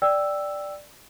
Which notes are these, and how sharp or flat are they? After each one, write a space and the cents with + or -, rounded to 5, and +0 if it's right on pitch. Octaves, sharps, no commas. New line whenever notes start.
D5 +0 G5 +0 E6 +0